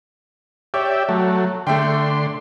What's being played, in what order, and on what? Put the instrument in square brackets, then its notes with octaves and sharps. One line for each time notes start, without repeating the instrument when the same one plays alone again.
[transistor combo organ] G4 D5 E5 [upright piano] C#5
[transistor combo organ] F#3 A3
[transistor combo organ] D3 C6 [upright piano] A3 E5 G5